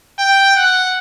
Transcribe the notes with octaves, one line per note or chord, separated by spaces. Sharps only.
G5
F#5